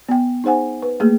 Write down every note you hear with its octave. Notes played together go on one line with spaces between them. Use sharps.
B3 G5
D#4 G#4 C5 F#5 G#5
B4
A3 A#3 G#4